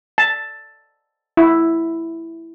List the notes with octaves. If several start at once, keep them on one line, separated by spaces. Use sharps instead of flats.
A5
E4